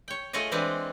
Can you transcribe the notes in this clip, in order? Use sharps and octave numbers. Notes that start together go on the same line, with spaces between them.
C#5 G5
A3 F4 G#4 C#5 D#5
E3 G#3 C4 D4 B4